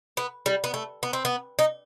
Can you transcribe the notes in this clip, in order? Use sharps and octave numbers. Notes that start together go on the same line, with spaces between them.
B3
G3
B3
A3
B3
C4
B3
D#4